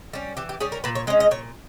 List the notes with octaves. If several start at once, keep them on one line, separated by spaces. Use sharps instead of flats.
G3 C#4
E3 G4
G4
G3 C#4 G#4
A#4
A#2 B4
C#5
G#3 C#4 D#5
D#5
A#2 C#5